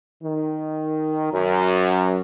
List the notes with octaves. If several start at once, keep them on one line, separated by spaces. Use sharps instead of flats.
D#3
F#2